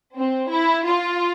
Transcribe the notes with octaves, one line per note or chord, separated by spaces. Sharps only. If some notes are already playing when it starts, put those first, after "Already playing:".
C4
E4
F4